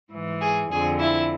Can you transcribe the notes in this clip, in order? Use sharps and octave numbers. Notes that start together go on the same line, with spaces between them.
G#2 E3
G#4
F2 D3 G#4
E4